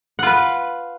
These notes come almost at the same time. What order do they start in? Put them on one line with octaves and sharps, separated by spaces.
F#5 F4 B4